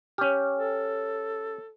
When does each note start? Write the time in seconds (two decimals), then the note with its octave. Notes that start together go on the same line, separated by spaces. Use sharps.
0.18 C#4 G4 C#5 F6
0.58 A4